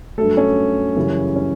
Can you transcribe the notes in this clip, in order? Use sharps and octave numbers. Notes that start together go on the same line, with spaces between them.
G2 F#3 A3 A4
C#4
F#2 C#3 E3 G3
C#4